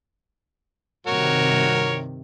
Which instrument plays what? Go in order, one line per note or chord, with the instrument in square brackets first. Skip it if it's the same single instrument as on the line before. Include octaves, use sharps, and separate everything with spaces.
[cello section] G2 C3 D#3 [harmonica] F#4 A#4 C#5